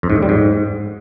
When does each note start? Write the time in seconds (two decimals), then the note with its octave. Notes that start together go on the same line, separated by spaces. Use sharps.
0.03 F2
0.10 G#2
0.16 A2
0.22 G3
0.29 G#2